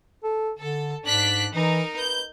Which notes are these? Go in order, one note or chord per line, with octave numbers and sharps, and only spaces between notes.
A4
D3 A4
G#2 D4 F#6 B6
E3 D#4 A#4
B4 G6